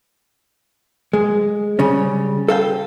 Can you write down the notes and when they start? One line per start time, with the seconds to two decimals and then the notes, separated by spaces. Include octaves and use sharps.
1.13 G#3
1.79 C#3 G3 C#4
2.48 A4 F5 G5